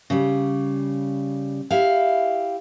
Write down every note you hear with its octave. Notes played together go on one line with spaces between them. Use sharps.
C#3 G3
E4 G4 F5